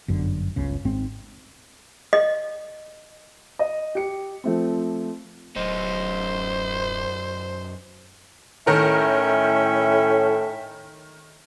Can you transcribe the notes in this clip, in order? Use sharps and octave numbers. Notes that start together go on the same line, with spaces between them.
G1 F#2 D3
G1 C#2 C#3
G#1 G#2 C4
D#5
D#5
G4 C#7
F3 A3 C4
D1 F#2 D#4 C5
A2 D#3 C#4 A#4 E5 G5